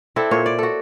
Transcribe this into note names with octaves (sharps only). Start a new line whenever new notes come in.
C4 D4 E4 A4
A#2 C5 C#5
D5
F#4 A4